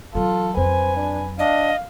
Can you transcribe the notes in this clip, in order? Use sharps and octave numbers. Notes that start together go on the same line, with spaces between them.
E3 F#3 F4 A4
F2 F#3 B4 C5 G#5
D4
D4 D#5 F5